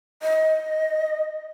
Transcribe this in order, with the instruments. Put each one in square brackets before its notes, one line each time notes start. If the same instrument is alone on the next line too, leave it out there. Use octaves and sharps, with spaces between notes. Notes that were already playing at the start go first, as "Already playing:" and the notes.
[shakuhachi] D#5